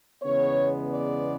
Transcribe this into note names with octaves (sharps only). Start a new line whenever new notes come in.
E2 C#3 G#3 B3 C#5
D5